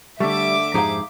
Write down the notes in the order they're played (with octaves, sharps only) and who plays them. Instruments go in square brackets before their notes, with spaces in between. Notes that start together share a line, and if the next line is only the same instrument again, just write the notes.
[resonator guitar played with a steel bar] D3 A3 [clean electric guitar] G3 [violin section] E5 D6
[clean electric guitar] F2 G#2 F5 [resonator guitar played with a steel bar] D#4 G4 G#4